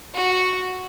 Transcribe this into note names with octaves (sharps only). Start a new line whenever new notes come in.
F#4